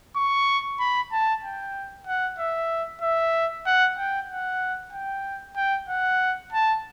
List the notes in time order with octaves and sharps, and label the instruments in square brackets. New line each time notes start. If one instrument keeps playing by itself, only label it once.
[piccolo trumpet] C#6
B5
A5
G5
F#5
E5
E5
F#5
G5
F#5
G5
G5
F#5
A5